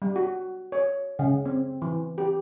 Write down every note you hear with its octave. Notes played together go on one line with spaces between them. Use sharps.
G3
F#4
C#5
C#3
C4
E3
G4